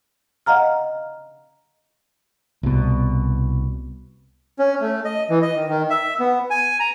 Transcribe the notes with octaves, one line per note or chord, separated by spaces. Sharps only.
D#5 F5 F#5 A#5 F6
C2 B2
C#4
A3
D#5
E3
D#5
D#3
D#3
E5
B3
G#5
A#5